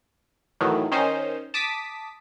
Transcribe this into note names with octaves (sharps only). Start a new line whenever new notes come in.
A2 D#3 E3 F#3
D#3 C#4 D#4 C5
A5 D6 D#6 B6